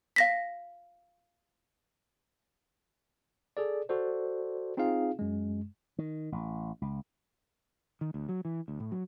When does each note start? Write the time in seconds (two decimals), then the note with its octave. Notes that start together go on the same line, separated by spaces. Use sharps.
0.16 F5 A#6 B6
3.57 G#4 A4 D5
3.89 F#4 A4 C5 D5
4.77 C4 D#4 F4 G#4 F5
5.19 F#2 G#3
5.98 D#3
6.32 A1
6.82 C#2
8.01 D#3
8.14 D2
8.29 F#3
8.45 E3
8.68 D2
8.80 A2
8.92 F#3